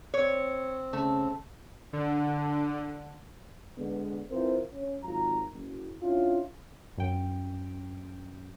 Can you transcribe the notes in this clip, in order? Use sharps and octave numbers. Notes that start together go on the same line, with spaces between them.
C4 C#5
C#3 A3
D3
D3 G#3 B3
E3 C4 F4 A#4 C5
C#4
G#1 F#3 F4 A#5
F#1
C#4 D4 E4 F4
F#2 G5